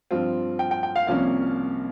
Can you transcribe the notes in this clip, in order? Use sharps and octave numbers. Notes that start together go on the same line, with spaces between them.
G2 F3 C4 F4
G5
G5
G5
F5
C2 C3 F3 A#3 C#4 F5